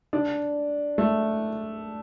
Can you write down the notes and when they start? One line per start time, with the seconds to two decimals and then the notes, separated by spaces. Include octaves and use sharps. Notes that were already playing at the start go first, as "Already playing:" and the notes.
0.13 D4
0.98 A3